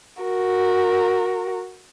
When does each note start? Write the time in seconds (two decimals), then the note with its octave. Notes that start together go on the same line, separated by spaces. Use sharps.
0.23 F#4 A#4